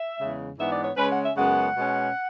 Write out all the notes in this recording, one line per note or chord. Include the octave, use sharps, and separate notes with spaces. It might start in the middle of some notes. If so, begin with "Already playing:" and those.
Already playing: E5
E2 C#3 G#3
G#2 E3 G#3 B3 D4 E5
D5
C#5
C#3 G#3 C#4 B4
F#5
E5
F#2 C#3 G#3 B3 F#5
B2 G#3 C#4